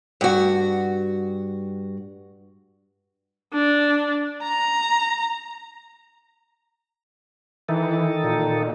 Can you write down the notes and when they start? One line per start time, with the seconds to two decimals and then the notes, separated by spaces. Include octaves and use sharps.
0.21 G2 F#4
3.54 D4
4.43 A#5
7.69 D#3 E3 D#4 A4
8.24 A#2